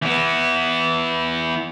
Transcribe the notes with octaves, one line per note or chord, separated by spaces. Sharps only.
E3 B3